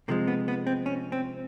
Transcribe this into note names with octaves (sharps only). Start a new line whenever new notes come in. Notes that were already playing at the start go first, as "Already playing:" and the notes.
C3 F3 G#3 A#3
B3
B3
C4
C#4
C4